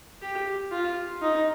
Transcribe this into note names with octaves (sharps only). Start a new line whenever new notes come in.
G4
F4
D#4